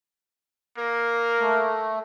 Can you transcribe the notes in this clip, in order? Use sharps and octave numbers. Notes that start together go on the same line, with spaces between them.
A#3 A#4
A3